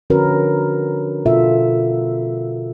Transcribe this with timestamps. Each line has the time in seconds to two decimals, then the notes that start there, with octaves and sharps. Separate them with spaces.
0.10 D3 F3 C#4 F#4 A#4 B4
1.26 B2 F4 A4 E5